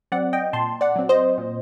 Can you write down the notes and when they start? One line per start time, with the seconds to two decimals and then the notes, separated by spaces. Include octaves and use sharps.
0.12 F#3 C4 D5 F#5
0.33 D#5 G5
0.53 A#2 A5 C6
0.81 D5 F#5
0.96 F#3 C4
1.09 C5 D#5
1.38 A#2